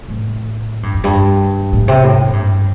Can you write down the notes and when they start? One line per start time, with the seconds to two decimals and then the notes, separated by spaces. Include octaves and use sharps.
0.09 A2
0.83 G2
0.94 F2
1.04 G2
1.73 A2
1.88 C3
2.03 A2
2.18 A2
2.33 G2